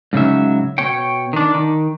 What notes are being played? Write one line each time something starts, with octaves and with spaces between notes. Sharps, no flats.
G#2 C#3 F#3 E5
B2 C#5 G5
D#3 D4
D#3